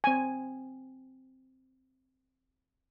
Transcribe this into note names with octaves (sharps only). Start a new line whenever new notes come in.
C4 G#5